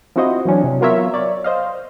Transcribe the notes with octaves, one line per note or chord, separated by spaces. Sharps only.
F3 C4 E4 F#4 C5 D#5
E3 F#3 C#4 D4
C3
F#3 B3 F4 A#4 C#5 E5
C#5 D5
C5 D#5 F5